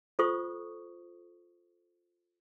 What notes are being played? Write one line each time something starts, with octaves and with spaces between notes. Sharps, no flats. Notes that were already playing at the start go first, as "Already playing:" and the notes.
F4 A4 C5 C#6 D#6